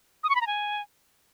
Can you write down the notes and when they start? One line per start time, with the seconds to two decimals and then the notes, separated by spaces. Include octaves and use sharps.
0.23 D#6
0.29 C#6
0.35 B5
0.41 A#5
0.47 G#5